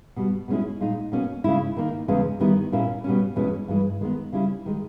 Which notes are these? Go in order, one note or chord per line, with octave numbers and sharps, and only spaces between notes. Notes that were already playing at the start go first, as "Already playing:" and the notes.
B2 G3 B3
B2 G#3 C#4 E4
A#2 G#3 D#4
B2 A#3 C#4
C#3 G#3 C#4 E4
D#3 A#3 D#4
E2 C#3 G#3 C#4
D#3 G3 B3 E4
A#2 A#3 C#4 E4
B2 G3 C#4
E2 B2 G#3 C#4 E4
G2 E3 G#3
D#3 G#3 B3
C#3 G3 C#4 E4
D#3 G#3